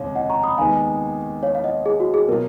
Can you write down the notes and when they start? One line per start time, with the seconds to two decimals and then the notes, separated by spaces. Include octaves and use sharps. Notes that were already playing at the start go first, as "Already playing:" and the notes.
Already playing: F1 D#2 C#3 G#3 C#5 F5
0.15 D#5 F#5
0.30 A#5 C#6
0.44 B5 D#6
0.58 D#2 D#3 G#3 B3 D#4 F5 G#5
1.43 C#5 F5
1.55 F5
1.64 D#5 F#5
1.86 G#4
2.00 F#4
2.14 G#4
2.28 B2 F#3 A#3 F4 A#4